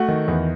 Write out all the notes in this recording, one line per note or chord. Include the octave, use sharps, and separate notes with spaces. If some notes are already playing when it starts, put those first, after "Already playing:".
Already playing: A3 F#4 F#5
D#3
E2